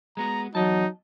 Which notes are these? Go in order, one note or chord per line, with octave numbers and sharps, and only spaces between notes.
G#3 B3 F#4 A#5
E2 F#3 D#4 D#5 A5